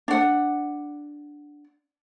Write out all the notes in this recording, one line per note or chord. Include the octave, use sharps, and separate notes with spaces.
D4 F#5